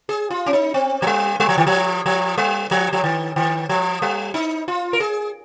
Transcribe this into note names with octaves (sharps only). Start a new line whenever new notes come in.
G#4
F4
C#4
D#4
C4
F3
G3
G3
F3
D#3
F3
F3
G3
F3
F3
D#3
D#3
F3
G3
D#4
F4
A#4
G#4